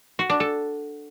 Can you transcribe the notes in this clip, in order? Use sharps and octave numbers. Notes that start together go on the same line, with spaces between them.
F#4
D4
A4